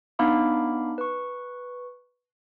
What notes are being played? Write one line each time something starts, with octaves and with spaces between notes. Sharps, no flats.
B3 D4 D#4 F5 B5 D6
B4 C#6